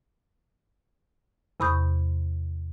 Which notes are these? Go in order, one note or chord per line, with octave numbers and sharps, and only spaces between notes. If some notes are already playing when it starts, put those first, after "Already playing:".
E2 C3 B5 C#6 D#6 G6